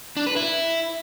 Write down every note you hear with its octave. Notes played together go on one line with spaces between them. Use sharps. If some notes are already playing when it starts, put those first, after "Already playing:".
D4
B4
E4